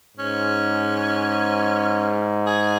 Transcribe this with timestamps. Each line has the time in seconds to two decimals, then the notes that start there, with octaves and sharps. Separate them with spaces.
0.17 G#2 C#4
2.46 G#4